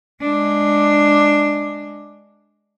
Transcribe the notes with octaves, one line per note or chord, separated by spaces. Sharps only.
G#3 D4